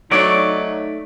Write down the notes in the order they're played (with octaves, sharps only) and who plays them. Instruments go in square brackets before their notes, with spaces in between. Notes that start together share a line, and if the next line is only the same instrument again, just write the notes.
[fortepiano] F#3 C#5 [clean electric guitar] A3 D5 [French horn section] D#4